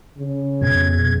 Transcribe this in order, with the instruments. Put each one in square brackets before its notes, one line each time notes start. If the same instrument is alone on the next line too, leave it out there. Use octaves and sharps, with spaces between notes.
[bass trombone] C#3
[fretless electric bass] F2 B2 [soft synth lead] G#6